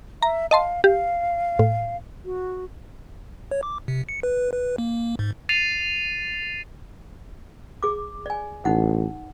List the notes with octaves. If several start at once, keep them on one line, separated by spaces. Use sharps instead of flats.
E5 A#5
D#5 F5 A5 C6
G4 F5
A2
F#4
C#5
D6
C3
C#7
B4
B4
A#3
G#2
A6 C7 D#7 F7
G#4 D6
D5 G#5
A1 D#4 F#5